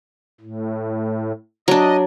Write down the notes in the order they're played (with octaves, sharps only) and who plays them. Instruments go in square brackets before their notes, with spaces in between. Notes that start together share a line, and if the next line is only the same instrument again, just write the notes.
[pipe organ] A2
[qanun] F#3 D4 [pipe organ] D#5